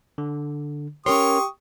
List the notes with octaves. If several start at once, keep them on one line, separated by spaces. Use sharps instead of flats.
D3
C#4 G4 A#4 C#5 C6 C#6 D#6